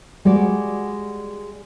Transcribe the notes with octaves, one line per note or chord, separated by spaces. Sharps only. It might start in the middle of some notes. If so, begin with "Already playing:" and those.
G3 G#3 F#4 D5